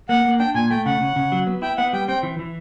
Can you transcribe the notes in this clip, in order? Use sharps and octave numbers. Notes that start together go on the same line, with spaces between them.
A#3 F#5
A#3
D4 G5
A#2 G#5
A3 G5
C#3 F#5
C#3
C#3
F#3
B3
E4 G5
B3 F#5
G3 G5
C4 G5
E3
E3